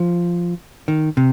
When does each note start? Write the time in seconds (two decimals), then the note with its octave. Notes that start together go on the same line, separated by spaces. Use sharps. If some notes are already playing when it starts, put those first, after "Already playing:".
Already playing: F3
0.88 D#3
1.17 C3